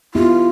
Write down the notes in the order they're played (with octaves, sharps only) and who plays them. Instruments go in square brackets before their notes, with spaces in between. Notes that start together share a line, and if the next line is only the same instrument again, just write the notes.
[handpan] B3 E4 G4 [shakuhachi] F4